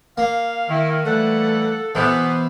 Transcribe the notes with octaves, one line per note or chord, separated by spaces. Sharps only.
A#3 F5
D#3 E4
E3 G3 A3 A4 F#5
B2 E3 B3 C5